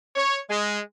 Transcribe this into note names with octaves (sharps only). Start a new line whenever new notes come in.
C#5
G#3